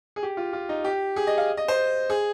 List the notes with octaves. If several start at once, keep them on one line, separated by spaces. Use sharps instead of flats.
G#4
G4
F4
F4
D#4
G4
G#4
D#5
F5
D#5
C5
G#4